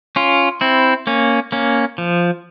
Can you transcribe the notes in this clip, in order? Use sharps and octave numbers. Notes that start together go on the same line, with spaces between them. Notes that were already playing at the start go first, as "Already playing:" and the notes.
C#4 F4
C4 E4
A#3 C#4
A#3 C#4
F3